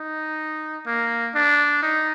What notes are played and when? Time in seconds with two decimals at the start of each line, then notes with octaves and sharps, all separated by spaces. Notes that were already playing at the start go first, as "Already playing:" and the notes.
Already playing: D#4
0.87 A#3
1.35 D4
1.83 D#4